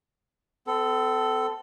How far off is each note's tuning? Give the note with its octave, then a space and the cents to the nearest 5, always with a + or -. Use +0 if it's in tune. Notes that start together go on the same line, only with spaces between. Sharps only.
C4 -45 A4 +0